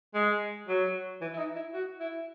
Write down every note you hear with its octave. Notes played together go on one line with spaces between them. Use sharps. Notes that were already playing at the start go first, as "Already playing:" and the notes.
G#3
F#3
E3
E4
D#4
E4
F#4
E4